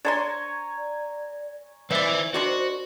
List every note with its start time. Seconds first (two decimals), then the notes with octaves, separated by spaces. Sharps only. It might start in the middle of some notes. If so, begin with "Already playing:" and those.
0.05 D4 C5 C#5 G#5 A#5 C6
0.77 D5
1.91 D#3 C4 B4 C5 D5 E5
2.34 D#3 D4 F#4 C6